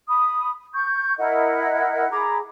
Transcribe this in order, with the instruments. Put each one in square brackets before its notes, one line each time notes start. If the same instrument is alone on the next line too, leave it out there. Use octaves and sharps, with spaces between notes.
[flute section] B5 D#6
C#6 G6
E4 A#4 D#5 F#5
G#4 A#5 B5 D6